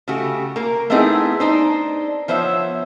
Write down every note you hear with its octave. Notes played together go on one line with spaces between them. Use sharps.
C#3 A3 F#4 G4
A#3 A#4
A3 B3 C4 D#4 E4 G#4
D4 D#4 C5
F3 B3 C5 C#5 E5